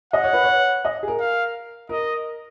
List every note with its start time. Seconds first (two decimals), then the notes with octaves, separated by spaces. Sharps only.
0.13 D#5 F#5
0.24 C#5
0.33 B4
0.44 C#5
0.85 D#5
1.03 G#4
1.08 A#4
1.20 F5
1.89 A#4 D#5